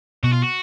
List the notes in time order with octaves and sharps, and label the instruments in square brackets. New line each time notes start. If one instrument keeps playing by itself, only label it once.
[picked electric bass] B2 [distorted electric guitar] F#4
[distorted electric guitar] F4
F#4